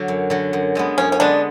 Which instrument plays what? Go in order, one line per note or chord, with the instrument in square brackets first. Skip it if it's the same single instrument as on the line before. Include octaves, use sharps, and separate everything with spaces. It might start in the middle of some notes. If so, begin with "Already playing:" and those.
Already playing: [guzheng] D3 F#3
F#2
D3 F#3
F#2
D3 G#3 B3
[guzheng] F#2 [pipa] C#4
[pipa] C#4
[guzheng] D3 G#3 B3 [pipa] D4